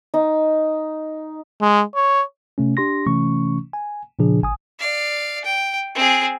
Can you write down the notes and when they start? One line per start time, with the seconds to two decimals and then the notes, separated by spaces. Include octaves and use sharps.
0.14 D#4
1.61 G#3
1.95 C#5
2.58 C3 A3 C#4
2.77 D4 G4 C6 A#6
3.06 C3 E3 A3 C#4 C#6
3.73 G#5
4.19 A#2 C#3 F3 D4 G#4
4.42 G#1 G#5 D#6
4.79 D5 F5
5.45 G5
5.95 C4 G#4